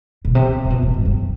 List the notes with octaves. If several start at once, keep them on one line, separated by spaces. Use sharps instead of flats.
B2
C3
C3
B2
A2
G2
F#2